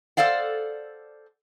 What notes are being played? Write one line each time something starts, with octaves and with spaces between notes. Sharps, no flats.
A4 C5 D5 F5 F#5